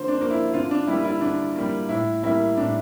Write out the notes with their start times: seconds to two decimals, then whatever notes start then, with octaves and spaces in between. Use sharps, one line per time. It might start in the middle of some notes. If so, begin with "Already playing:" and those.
Already playing: D3 F3 A#3 C5
0.08 D4
0.20 F3 A#3
0.31 E4
0.53 D3 F4
0.71 D4
0.87 G3 A#3 E4
1.04 E4
1.21 D3 D4
1.55 G3 A#3
1.89 A2 E4
2.23 G3 A#3 E4
2.57 A2 D4